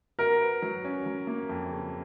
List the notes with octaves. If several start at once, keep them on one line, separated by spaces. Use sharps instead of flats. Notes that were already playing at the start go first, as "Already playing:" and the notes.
F#4 A#4
B4
F#3
C#4
F#3
A#3
F2
C#3